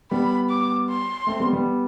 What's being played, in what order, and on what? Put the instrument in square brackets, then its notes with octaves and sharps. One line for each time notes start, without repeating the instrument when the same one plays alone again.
[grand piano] G3 B3 [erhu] B5
[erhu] D6
C6
[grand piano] A3 C4
G3 B3
G3 B3